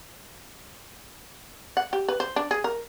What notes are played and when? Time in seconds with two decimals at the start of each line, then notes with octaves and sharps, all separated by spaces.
1.77 F#5
1.93 G4
2.09 B4
2.20 C5
2.36 D4
2.51 G#4
2.64 A#4